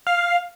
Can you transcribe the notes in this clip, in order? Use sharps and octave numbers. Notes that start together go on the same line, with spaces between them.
F5